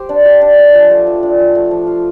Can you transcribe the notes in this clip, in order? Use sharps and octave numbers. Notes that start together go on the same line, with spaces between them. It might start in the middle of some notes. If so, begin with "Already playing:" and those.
Already playing: G4 C5
D4
G4
D4
D4
F3
A3
F3
D4
F3
A3
F3
F4